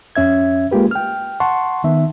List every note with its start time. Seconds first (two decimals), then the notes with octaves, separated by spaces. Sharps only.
0.16 F2 C#4 E5 G#6
0.71 G#3 A#3 F4 G4 B4
0.91 G5 F6
1.40 F#5 A5 C6 C#6
1.84 D#3 B3 E5